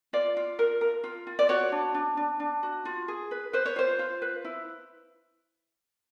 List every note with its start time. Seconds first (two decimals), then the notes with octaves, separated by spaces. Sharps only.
0.13 F4 D5
0.37 F4
0.59 A#4
0.81 A#4
1.04 F4
1.27 F4
1.39 D5
1.49 F#4 C#5
1.72 D4
1.94 D4
2.17 D4
2.40 D4
2.63 F#4
2.85 F4
3.08 G#4
3.31 B4
3.53 B4 C5
3.66 C#5
3.76 F4 C5
3.99 F4
4.22 B4
4.45 E4